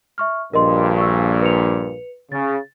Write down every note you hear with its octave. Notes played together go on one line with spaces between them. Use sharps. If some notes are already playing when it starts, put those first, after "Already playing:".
E5 C#6 F6
A#1 G2 A#2 A#4 D#5 C6
C#6 E6
B4 C#7 F7
C#3 A6